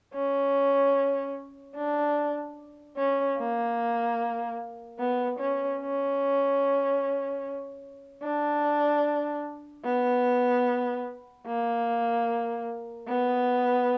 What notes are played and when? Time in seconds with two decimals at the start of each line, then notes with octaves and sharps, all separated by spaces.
0.14 C#4
1.76 D4
2.96 C#4
3.37 A#3
4.99 B3
5.39 C#4
5.80 C#4
8.23 D4
9.85 B3
11.47 A#3
13.08 B3